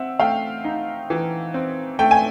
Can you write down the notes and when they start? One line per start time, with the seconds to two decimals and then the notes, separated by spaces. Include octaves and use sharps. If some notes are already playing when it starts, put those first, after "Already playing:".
Already playing: C4 E5 F#5
0.19 A3 F5 G5
0.64 D#4
1.10 E3
1.54 C4
1.99 A3 G5
2.11 G#5